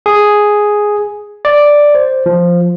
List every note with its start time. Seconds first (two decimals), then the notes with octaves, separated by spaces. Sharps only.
0.06 G#4
1.45 D5
1.95 C5
2.26 F3